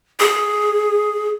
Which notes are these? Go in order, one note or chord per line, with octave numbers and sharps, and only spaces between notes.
G#4